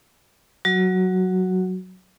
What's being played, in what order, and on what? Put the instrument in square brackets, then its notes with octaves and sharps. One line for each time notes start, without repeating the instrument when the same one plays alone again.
[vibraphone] F#3 F#4